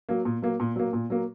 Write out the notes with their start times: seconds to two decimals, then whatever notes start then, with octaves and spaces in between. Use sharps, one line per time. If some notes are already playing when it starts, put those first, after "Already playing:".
0.09 F#3 A#3
0.25 A#2
0.42 F#3 A#3
0.60 A#2
0.76 F#3 A#3
0.93 A#2
1.10 F#3 A#3